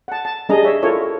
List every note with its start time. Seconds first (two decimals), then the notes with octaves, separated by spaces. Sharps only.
0.08 F#5 A5
0.25 A5
0.49 G3 D4 G#4 D#5 A#5
0.64 C#5 E5
0.83 E4 F4 A4 A#4 C#5